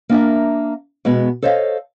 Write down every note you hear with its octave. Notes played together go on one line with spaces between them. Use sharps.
A#3 D4 A#4 E5
B2 G#3 B3
A4 C5 C#5 D#5 F5